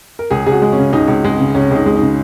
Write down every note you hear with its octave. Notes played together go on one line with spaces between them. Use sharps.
A#4
C#2 G#4
C#2 G#4
F#4
G#3
C#4
C#3
C#2 D#4
C#2
G#3
C#3
C#2 C#4
C#2 D#4
G#3
D#4
C#3